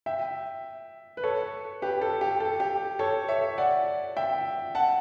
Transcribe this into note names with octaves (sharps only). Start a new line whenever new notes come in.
E5 G5
B4
A4 C#5
G4 B4
A4
G4
A4
G4
A4 C#5
C#5 E5
D5 F#5
E5 G5
F#5 A5